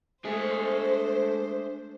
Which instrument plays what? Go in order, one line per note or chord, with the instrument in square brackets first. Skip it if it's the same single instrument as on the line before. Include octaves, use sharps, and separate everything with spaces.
[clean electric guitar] G#3 A3 G#4 [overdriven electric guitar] D4 G#5 [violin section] C5